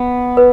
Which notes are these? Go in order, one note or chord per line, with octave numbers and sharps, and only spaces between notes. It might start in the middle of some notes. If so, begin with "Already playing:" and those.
Already playing: B3
B4